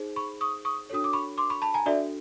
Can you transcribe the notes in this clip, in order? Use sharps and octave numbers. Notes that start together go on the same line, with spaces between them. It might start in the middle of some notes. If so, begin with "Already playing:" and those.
Already playing: D#4 G#4 C5
B5 C#6
C#6 D#6
C#6 D#6
D4 F#4 A4 C#5 D#6
D6
B5 C#6
C6 D6
B5 C#6
A5 B5
G#5 A#5
D4 F#4 A4 D5 E5